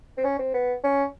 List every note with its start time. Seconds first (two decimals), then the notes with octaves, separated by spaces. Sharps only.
0.18 C4
0.24 C#4
0.39 C4
0.54 B3
0.84 C#4